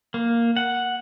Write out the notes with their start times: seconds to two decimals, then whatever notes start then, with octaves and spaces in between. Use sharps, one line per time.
0.14 A#3
0.57 F#5